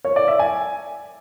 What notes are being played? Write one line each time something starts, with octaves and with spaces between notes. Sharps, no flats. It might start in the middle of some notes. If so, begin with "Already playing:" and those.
C#5
D5
E5
G#5